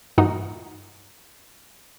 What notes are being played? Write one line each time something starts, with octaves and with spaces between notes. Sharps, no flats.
G2 A#2 E3 D#4 F#4